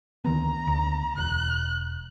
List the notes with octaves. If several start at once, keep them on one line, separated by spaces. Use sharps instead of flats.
D2 D#3 B3 A#5
D2
E1 F#6